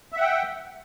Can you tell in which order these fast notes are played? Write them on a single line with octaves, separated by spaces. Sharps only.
E5 F#5 G5